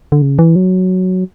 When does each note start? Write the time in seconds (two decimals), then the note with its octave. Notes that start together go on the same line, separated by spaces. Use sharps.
0.12 D3
0.22 C#3
0.39 E3
0.56 F#3